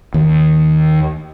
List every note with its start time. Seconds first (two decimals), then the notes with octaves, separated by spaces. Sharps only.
0.14 D#2